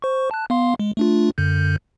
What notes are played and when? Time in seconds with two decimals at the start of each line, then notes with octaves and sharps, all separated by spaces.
0.02 C5 C#6
0.31 A5 F#6
0.50 B3 F5 C6
0.80 G#3
0.97 A3 D4 F4
1.38 F#2 D3 G6